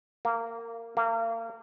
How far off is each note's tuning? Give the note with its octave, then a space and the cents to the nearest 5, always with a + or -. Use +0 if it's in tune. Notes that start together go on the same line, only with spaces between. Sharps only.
A#3 -20
A#3 -35